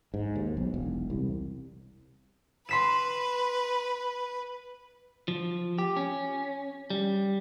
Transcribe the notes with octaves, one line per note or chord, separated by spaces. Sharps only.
G#2
D#2
B1
E1
C2
B4 C6 B6 E7
F3
G4
C#4
G3